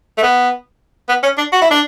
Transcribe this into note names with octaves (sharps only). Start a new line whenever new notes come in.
A3
B3
B3
C#4
D4
F#4
E4
D4